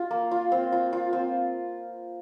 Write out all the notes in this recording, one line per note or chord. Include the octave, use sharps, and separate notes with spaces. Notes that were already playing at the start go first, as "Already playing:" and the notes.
Already playing: F4
A#3
F4
C4
F4
F4
C4